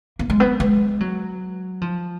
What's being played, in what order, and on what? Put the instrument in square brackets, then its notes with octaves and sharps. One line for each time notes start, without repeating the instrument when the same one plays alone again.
[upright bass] A#3
G#3
B3
G#3
F#3
F3